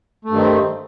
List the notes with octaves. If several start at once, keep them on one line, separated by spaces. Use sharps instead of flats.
G2 D#3 A3 C4